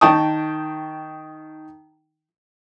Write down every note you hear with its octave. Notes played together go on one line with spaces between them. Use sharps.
D#3 G5 A5 C#6 D#6